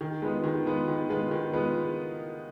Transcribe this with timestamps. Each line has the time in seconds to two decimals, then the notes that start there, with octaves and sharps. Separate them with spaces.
0.01 D#3
0.22 G#3 B3 F4 B4
0.44 D#3
0.66 G#3 B3 F4 B4
0.88 D#3
1.09 G#3 B3 F4 B4
1.31 D#3
1.53 G#3 B3 F4 B4